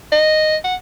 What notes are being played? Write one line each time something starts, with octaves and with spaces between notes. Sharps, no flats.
D#5
F#5